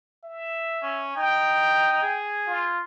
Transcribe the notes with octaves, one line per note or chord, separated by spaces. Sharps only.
E5
C#4
D#4 G5
G#4
F4